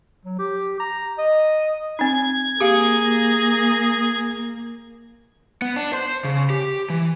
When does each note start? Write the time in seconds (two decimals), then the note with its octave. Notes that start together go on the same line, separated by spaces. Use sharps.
0.25 F#3
0.39 G4
0.80 A#5
1.18 D#5
1.99 C4 D#4 G#6
2.61 A#3 G4 G#4 F5
5.62 B3
5.76 D4
5.93 C5
6.24 C#3
6.50 G4
6.90 E3